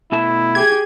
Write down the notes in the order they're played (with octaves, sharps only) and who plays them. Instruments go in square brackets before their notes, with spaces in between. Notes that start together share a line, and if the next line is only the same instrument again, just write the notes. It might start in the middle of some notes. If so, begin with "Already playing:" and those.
[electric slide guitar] B2 A3 A5 [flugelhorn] E4
[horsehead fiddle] G4 G#4 [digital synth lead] G#6